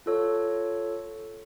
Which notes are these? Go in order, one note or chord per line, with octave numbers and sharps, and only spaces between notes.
F4 A4 C#5